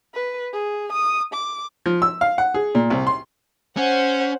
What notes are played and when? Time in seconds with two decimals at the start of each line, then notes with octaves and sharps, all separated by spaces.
0.14 B4
0.53 G#4
0.93 D#6
1.34 D6
1.86 F3
2.02 E6
2.21 F5
2.38 F#5
2.54 G#4
2.75 A#2
2.90 C2
3.07 C6
3.77 C#4 C5 F#5